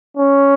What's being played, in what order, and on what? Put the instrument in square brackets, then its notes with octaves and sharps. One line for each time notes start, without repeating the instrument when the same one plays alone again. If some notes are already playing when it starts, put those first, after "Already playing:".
[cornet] C#4